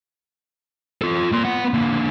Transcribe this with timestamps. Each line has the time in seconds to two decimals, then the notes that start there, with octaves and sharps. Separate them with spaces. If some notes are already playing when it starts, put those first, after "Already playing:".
1.02 F4 A4
1.32 A#3 C6
1.44 B3 F#5
1.74 D3 A#3